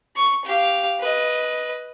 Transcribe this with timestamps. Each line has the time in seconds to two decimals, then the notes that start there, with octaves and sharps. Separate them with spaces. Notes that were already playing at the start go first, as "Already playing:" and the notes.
0.16 C#6
0.44 G4 F5
1.00 B4 D#5